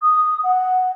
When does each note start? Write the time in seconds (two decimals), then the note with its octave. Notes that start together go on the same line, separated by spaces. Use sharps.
0.01 D#6
0.43 F#5